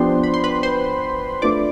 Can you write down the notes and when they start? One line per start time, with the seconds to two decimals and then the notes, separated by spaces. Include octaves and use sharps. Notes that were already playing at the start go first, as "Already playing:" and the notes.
Already playing: F3 B3 D4 G4 C5 C6
0.23 B5
0.34 C6
0.44 B4 B5
0.63 C5 C6
1.42 A3 D4 F4 B4 D5 D6